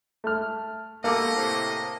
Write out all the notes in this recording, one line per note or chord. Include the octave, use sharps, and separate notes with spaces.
A3 F6
G2 B2 A3 A#3 D#5 F5 A5 D6
A2 C3